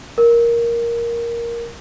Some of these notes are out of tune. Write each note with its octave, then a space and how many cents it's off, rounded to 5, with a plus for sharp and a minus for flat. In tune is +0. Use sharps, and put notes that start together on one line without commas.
A#4 +5